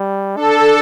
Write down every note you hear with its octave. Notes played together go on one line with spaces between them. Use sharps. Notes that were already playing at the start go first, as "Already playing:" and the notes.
Already playing: G3
D4 A4